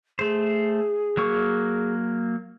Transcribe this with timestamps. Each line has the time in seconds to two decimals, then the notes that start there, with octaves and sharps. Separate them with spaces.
0.19 A3 G#4 C5
1.17 F#3 A#3 C#6